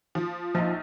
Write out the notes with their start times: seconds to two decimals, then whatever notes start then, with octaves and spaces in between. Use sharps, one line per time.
0.15 F3
0.55 A#1 F3 D#4